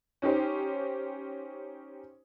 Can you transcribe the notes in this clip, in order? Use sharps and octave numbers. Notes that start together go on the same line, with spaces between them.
C#4 D#4 G4 C5